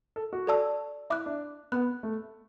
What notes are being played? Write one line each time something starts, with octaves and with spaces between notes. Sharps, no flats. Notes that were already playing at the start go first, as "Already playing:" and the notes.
A4
F#4
A4 D5 A5 E6
E4 E5 D6 F#6
D4
B3 F#5 B5 F#6
A3